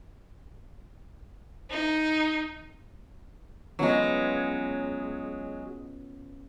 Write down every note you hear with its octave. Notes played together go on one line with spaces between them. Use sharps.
D#4
F#3 G#3 B3 C#4 F4